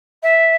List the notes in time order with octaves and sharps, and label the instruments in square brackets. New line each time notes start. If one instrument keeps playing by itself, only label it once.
[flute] E5